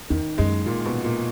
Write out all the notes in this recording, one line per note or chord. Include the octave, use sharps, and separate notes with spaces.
E2 D#3
F#2 G#3
A#2
B2
A#2